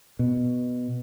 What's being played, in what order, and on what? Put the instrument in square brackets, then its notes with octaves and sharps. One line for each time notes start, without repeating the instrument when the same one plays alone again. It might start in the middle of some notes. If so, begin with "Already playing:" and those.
[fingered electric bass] B2